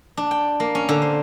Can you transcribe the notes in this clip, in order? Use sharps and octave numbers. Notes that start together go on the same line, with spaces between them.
D4
G5
A#3
C#4
D3
C5